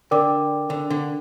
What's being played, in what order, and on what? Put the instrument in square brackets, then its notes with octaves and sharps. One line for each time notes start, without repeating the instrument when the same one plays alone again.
[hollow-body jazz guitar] D3 [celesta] A#4 D5 G5 D6
[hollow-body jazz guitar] D3
D3